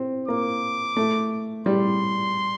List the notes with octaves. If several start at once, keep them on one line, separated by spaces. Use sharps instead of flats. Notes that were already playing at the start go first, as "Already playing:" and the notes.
Already playing: C4
A#3 D6
A3
G3 C6